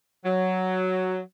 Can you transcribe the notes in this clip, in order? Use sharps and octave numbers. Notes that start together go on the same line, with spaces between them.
F#3